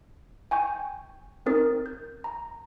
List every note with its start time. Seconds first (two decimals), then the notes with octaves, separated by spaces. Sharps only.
0.51 G5 G#5 C#6 G6
1.46 C4 C#4 D#4 A#4 D#6 A6
1.86 G6
2.24 A#5